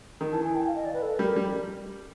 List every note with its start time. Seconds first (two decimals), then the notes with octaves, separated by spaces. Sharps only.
0.21 D#3
0.32 E3 A5
0.44 G#5
0.55 G5
0.67 F5
0.76 D#5
0.85 D5
0.94 B4
1.02 A4
1.19 G3 A#4
1.36 G3